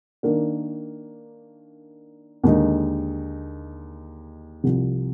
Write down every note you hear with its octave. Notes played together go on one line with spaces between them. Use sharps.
D#3 A#3 D4
D#2 D3 G#3 D#4
C2 C3 F3